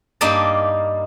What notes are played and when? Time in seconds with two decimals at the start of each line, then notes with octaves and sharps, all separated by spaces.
0.21 G2 A#3 D#4 G4 D5 A5